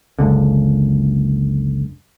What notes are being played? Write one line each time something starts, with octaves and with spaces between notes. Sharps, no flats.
F#1 C#2 D3